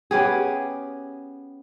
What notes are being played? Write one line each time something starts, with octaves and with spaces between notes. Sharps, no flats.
B3 C#4 G4 G#4